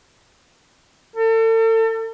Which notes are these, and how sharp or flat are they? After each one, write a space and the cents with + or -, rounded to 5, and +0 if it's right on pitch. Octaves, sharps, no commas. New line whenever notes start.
A4 +40